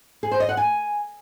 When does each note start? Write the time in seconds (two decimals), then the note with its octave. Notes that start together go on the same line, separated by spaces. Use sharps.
0.23 G#4
0.31 C5
0.40 D#5
0.49 F#5
0.57 G#5